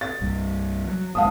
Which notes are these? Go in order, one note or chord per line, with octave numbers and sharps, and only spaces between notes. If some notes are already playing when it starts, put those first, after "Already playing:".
A6
C2 G2 G3
F#3
G1 G#3 F5 A5 D#6